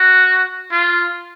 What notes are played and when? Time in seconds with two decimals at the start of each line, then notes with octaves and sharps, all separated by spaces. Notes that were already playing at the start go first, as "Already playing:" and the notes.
Already playing: F#4
0.71 F4